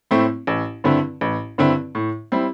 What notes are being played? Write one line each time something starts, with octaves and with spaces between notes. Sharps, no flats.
A2 A3 C4 E4
A1
G2 D3 C4 E4
A1
G2 D3 C4 E4
A2
G3 C4 E4